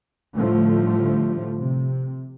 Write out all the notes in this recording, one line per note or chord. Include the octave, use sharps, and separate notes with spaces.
A2 D3 F3 G3 A3
C3